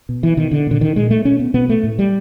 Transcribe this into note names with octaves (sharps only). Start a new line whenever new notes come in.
B2
E3
B2 D#3
D3
A#2 D3
D#3
A#2 G#3
A3
B2 C#4
B3
B2 B3
A3
A2
G3